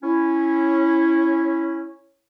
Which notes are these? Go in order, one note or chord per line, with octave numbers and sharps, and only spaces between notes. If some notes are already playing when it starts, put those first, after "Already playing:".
C#4 E4